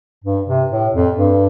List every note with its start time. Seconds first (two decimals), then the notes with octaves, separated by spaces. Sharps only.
0.24 G2
0.47 C3
0.70 A2
0.94 F2
1.16 G2